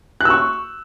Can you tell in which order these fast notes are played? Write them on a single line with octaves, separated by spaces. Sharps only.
F#6 E6 C#6